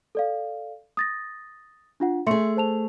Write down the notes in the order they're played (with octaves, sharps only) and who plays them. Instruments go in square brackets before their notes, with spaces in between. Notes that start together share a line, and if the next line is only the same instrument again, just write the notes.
[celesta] A4 D5 F5
D#6 A6 A#6
D4 F4 F#5
[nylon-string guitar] A3 G#4 [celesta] E5 C6 C#7
[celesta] C5 A5 F7